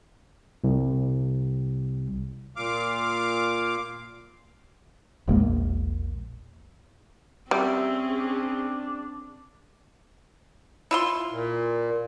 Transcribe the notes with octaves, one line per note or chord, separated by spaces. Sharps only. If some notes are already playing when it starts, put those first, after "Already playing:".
C2
A#2 F5 D6
E1 A#1 G#3 A#3
G3 C4 C#4 G#4 E5
D4
E4 F4 C6
A#2